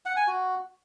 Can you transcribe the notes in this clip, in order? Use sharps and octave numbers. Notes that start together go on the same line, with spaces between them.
F#5
G#5
F#4